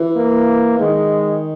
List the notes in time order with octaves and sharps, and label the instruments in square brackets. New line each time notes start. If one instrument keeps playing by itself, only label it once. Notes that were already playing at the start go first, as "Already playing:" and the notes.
Already playing: [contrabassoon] E3
[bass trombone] A#3
[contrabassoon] D#3 [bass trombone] G#3